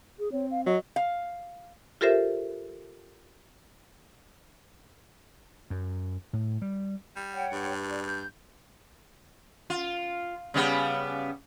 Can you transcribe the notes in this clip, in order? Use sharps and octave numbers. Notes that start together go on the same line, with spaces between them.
G#4
C4 C#5
F5
F#3 D#5
F5
F4 G4 A4 A#4 C5 E5
F#2
A2
G3
G3
C#5 F#5 G5
G2
D5
G6
F4
C#3 G3 B3